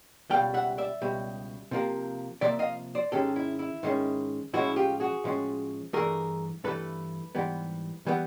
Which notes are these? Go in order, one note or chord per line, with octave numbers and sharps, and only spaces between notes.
C#2 B2 G3 F5 G5
E5 F#5
D5 E5
C#2 B2 G3
C3 F3 A#3
C3 F3 A#3 D5 E5
D#5 F5
C5 D5
G#2 D#3 G#3 C#4 G4 A4
E4
E4
G#2 D#3 G#3 C#4
A2 F3 G#3 C#4 E4 F#4
F4 G4
F#4 G#4
A2 F3 G#3 C#4
G2 E3 A3 G#4 A#4
G2 E3 A3 A4 B4
G#2 E3 G3 B3
E3 G3 B3